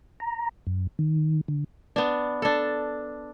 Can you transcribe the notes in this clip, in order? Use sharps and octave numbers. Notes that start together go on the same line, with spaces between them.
A#5
F#2
D#3
D3
B3 D4
D4 A4